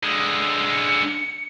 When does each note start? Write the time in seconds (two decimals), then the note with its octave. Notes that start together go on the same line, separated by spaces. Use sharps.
0.03 D3 G#3 D#6
0.71 C#7